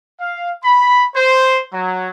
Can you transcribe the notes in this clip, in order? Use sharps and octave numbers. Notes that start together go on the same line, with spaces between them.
F5
B5
C5
F#3